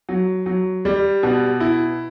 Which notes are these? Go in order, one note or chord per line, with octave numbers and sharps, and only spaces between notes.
F#3
F#3
G3
B2
E4